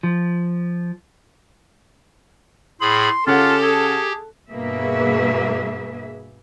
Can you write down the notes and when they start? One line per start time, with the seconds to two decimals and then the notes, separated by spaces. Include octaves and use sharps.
0.03 F3
2.81 A2 G#4 B5 C6
3.27 C#3 C#4 F4 G4 A4 F#5
3.63 G#4
4.51 G2 B2 A#3 G#4 B4 E5